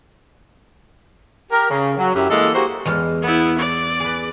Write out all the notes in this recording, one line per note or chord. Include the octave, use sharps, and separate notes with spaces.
G4 A#4
C#3
F#3
F#2 E4 G4
E3 G#3 A#3 A4
A#3 F#4 G4 C5
E2 G#3 F5
B3 E4
D5
G#4 B4